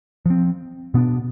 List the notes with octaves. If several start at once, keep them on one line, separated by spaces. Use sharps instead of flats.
F3 C4
B2 B3 D4